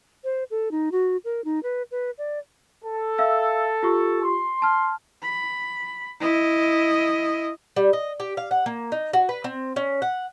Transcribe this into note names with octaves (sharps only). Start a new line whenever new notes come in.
C5
A4
D#4
F#4
A#4
D#4
B4
B4
D5
A4
E5 F5 E6
F4 G4 C#6
C6
A5 F6
B5
E4 D#5
G3
D#5
G4
F5
F#5
A#3
D#4
F#4
B4
C4
C#4
F#5